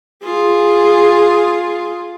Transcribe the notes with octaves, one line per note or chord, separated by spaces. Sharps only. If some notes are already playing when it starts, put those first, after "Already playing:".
F4 G#4